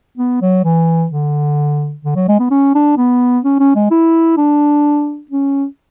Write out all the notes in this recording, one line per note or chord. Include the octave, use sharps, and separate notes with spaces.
B3
F#3
E3
D3
D3
F#3
G#3
B3
C#4
D4
B3
C#4
C#4
G#3
E4
D4
C#4